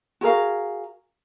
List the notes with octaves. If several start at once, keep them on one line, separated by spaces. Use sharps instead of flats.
F#4 G#4 A#4 F5